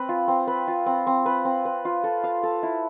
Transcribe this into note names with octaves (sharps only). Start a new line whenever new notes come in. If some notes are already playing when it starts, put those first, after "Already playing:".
Already playing: C4 B4
F4
C4
B4
F4
C4
C4
B4
C4
B4
F4
A4
F5
A4
E4